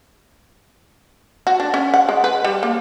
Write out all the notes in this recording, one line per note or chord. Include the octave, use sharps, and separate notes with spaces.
F#4
D4
C#4
F#5
G#3
B4
G3
A#3